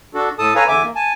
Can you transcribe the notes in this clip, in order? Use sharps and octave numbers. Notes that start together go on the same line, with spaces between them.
D4 F#4 A4
A2 A4 A5 D#6
A4 B4 C#5 F5 G#5 A#5
E2 D3 E5 G#5 D6
A#3
G#5 A5